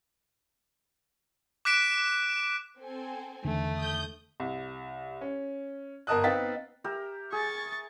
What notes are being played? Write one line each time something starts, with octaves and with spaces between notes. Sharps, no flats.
D6 F#6 B6 D7 E7
C4 A4 G#5
E2 D3 D#3 A3
D#6 G6
C2
C#4
G1 A#4 D#5 A5 D#6 F#6
B3 C4 D#4 F5 A6 B6
G4 A#4 E5
G#4 C#6 A6